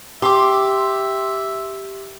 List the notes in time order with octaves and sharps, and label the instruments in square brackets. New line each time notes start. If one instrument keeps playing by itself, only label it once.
[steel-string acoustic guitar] G4 [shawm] E5 [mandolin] C6 D6